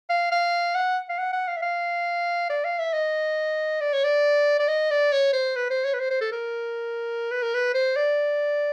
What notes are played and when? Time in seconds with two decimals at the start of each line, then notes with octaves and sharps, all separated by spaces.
0.09 F5
0.31 F5
0.75 F#5
1.09 F5
1.18 F#5
1.32 F#5
1.48 F5
1.56 E5
1.62 F5
2.50 D5
2.64 F5
2.79 E5
2.93 D#5
3.81 D5
3.93 C#5
4.04 D5
4.59 D5
4.68 D#5
4.91 D5
5.12 C#5
5.33 C5
5.56 B4
5.70 C5
5.85 C#5
5.94 B4
5.99 C5
6.11 C5
6.21 A4
6.32 A#4
7.31 B4
7.42 A#4
7.54 B4
7.74 C5
7.96 D5